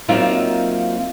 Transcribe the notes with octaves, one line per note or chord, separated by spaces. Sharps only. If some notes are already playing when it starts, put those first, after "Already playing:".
F#3 A#3 C4 D#4 F4 E5